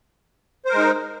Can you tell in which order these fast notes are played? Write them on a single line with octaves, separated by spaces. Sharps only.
C5 A#4 G#3 D#4